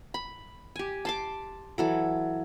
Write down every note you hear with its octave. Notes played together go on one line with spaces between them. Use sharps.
B5
G4 G#5
A5 C6 D6
E3 F#3 A4